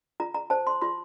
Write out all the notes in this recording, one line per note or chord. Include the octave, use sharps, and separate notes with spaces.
F4 A#5
A#5
C5 A5
C6
F4 C6